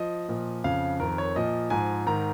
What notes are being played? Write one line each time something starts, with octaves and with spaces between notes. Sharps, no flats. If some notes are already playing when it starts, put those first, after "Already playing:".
Already playing: F3 D#5
A#2 F3
F2 C#3 F3 F5
F2 D#3 A#4
C#5
A#2 F3 D#5
G#2 F3 G#5
G#2 D#3 A#5